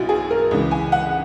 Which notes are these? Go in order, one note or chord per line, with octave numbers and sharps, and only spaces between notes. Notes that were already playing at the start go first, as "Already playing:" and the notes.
Already playing: B1 B2 F#3 E4 F#4
G#4
A#4
C#2 C#3 E3
G#5
F#5